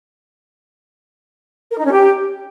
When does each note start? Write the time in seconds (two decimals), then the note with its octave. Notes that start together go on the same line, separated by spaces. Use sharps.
1.71 A#4
1.78 D#4
1.85 C#4
1.92 G4